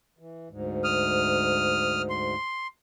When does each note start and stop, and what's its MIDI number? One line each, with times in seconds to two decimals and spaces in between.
0.19 0.48 52
0.50 2.35 38
0.50 2.35 44
0.84 2.02 87
0.84 2.02 89
2.10 2.67 84